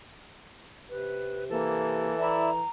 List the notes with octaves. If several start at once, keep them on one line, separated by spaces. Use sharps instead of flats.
C3 B4
E3 A#3 A4
E4 D5 E5 A#5